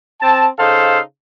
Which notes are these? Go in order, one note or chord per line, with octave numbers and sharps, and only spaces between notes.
C4 A5
C#3 D#4 A4 C5 F5